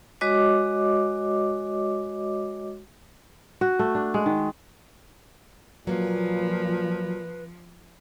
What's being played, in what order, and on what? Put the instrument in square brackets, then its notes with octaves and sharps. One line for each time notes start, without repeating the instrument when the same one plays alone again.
[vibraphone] G#3 F#4 C#5 D#5 D6
[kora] F#4
A3
D4
G#3
D#3
[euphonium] A#2 [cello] F3 [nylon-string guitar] F#3 A#3 [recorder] B4